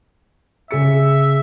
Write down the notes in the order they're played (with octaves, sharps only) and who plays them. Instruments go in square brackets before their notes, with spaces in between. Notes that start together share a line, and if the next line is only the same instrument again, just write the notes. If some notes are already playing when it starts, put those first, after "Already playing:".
[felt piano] C#3 G#4 C#7 [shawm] E5